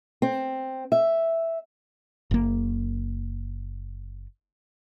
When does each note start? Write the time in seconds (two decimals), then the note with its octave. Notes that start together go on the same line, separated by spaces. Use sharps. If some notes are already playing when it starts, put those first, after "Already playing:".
0.22 C4
0.92 E5
2.31 F#1 A#3